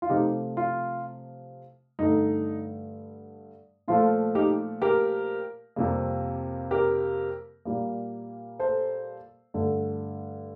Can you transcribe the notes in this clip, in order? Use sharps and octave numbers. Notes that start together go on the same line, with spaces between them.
F4
C3 F3 A3 D#4 G4
F4
G2 D3 A3 D#4
A#2 F3 A3 F4
D#4 G4
G4 A#4
F2 C3 G3 A#3
G4 A#4
A#2 G3 A#3
A4 C5
G2 D3 A3